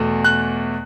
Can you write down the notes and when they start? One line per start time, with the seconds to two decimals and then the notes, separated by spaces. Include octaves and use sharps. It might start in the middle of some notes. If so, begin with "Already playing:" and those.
Already playing: E2 B2 A3
0.24 F#6